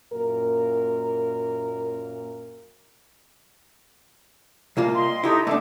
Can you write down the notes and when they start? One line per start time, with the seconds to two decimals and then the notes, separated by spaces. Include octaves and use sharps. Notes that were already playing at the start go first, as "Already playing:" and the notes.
0.13 F#2 A#2 A#3 A#4
4.77 C2 A#3 F4
4.94 D#5 G5 C6
5.24 D#4 E4 G4 A4
5.47 A3 A#3 D4 F#5 D6